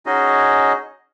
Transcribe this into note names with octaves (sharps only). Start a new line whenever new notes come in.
C#4 D#4 F#4 G#4 D#5